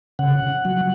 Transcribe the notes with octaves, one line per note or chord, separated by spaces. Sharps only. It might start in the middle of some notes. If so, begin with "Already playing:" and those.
C#3 F#5
F#3